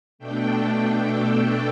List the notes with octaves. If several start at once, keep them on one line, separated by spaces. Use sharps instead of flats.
B2 A3 D4 G5
A4